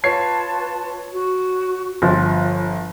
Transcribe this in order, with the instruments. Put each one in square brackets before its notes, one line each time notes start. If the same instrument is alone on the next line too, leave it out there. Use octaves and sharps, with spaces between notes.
[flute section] F4 B4 A5 [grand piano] C#5 C7
[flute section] F#4
[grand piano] G1 F3 [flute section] F4